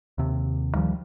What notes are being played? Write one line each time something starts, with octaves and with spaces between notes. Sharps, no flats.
D#2 C3
D2 D#3 F3 G3